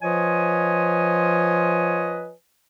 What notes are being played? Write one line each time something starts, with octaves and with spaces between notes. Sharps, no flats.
F3 F4 B4 C#5 D#5 G#5